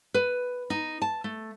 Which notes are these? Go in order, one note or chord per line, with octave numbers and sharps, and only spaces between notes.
B4
D#4
A5
A3